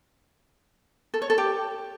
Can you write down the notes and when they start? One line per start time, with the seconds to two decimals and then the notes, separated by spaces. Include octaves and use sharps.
1.14 A4
1.22 C#5
1.30 A4
1.38 G4